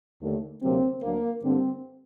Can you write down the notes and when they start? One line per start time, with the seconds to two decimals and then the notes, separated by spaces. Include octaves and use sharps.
0.22 D#2 D3 A3
0.62 D2 C3 F#3 A#3 C4
1.02 D2 D3 F#3 A#3
1.42 G2 D3 G3 A#3 C4